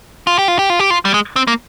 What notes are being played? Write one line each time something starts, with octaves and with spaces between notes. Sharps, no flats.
F4
G4
F4
G4
F4
G4
F4
G3
G#3
C4
A#3